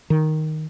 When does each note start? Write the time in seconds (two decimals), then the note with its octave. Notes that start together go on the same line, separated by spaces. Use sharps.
0.10 D#3